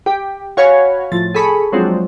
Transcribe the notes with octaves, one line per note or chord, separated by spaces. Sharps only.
G4
F#4 C#5 F5 G#5 B5 C#6
A2 F3 A6
G#4 A4 B5 C#6
F3 F#3 G#3 C4 D4